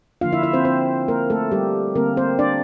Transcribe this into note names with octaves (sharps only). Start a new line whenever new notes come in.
D3 F3 A#3 D4 F4 F5
E4 E5
E4 E5
C4 C5
C4 C5
A#3 A#4
A3 A4
G3 G4
D3 G3 A#3 C4 A#4
C4 C5
D4 D5